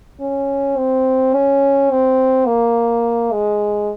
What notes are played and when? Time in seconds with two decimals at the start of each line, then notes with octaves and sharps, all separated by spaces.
0.21 C#4
0.77 C4
1.34 C#4
1.91 C4
2.46 A#3
3.32 G#3